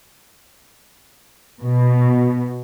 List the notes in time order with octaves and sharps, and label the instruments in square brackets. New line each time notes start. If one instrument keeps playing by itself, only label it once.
[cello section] B2